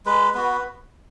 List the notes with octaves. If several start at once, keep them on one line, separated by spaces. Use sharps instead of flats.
G#3 B4
B3 F#4 B4